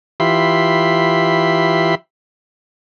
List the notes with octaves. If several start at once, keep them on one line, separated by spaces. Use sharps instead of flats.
E3 F4 G4 E5 B5 C6